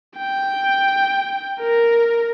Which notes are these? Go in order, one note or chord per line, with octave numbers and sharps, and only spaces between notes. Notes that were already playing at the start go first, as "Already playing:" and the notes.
G5
A#4